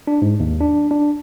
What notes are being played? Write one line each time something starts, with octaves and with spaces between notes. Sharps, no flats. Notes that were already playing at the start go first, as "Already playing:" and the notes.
D4
G#2
D#2
D4
D4